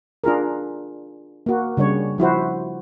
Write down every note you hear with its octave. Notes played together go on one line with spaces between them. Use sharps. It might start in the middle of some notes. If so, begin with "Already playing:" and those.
D4 F4 G#4 A#4
A#3 F#4
C#3 G3 D4 C#5
F3 E4 F#4 C5